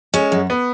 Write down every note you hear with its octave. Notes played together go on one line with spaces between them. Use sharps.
G#3 C#4
F#2
B3